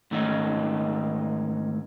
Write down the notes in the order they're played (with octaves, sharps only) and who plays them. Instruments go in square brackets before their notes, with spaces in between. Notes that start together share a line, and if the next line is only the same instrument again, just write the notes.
[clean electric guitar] G#2 D#3 A3 C#4 D#4